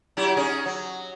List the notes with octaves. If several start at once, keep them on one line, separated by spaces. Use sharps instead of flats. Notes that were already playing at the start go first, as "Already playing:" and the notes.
F#3 E4 G4
C#4 D#4 G#4
F#3